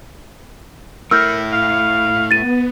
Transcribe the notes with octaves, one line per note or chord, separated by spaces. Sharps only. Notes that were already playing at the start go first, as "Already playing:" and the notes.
A3 E4 A#4 E6 F6 G6
F5
B3 A6 D#7